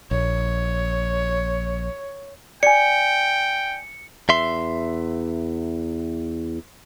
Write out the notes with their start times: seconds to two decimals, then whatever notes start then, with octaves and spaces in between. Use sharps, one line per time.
0.11 A#1 C#5
2.63 D5 G5 G#5 C#7
4.29 E2 E5 C6